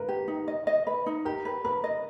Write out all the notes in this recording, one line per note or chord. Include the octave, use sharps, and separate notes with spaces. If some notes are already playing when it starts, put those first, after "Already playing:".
Already playing: A#4 B4
G4
D#4
D#5
D#5
B4
D#4
G4 A#4
B4
A#4 B4
D#5